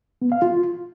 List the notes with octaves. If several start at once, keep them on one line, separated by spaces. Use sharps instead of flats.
B3
F5
F4